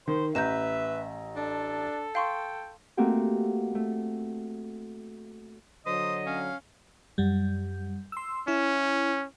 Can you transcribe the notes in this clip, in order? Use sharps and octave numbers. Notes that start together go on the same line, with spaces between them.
D#3 C5
A1 B4 E5 A#5 G6 E7
D4 A4
F5 G5 C6 C#6
A3 A#3 C4 F#4 G4
A3
D3 F#3 C5 D#5 D#6
C#4 F5
F#2 G3
C6 E6
C#4 E4